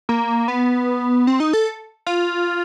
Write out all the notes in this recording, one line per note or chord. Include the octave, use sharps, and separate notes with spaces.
A#3
B3
C4
D#4
A4
F4